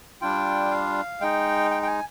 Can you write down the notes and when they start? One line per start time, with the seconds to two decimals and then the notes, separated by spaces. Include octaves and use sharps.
0.21 G3 D4 F4 G5
0.71 F5
1.21 G#3 D#4 G5
1.71 G5
1.83 G5
1.87 G#5